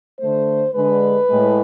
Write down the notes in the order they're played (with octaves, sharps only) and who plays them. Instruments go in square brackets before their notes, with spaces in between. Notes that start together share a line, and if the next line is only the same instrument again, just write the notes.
[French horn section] D3 A3 C5
D3 G#3 B4
A2 G#3